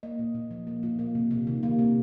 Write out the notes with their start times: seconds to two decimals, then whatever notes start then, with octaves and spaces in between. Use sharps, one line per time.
0.03 A#3 D#5
0.19 A#2
0.35 A#2
0.51 F3
0.67 A#3
0.83 A#2
0.99 A#3
1.15 C3
1.31 C3
1.47 D#3
1.63 A#3
1.79 C3